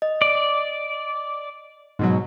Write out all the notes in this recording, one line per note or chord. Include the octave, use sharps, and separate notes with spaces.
D#5
D5
G#2 B2 F#3